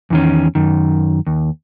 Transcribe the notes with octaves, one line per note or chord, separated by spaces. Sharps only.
E2 D#3 C#4
F#2 D#3
D#2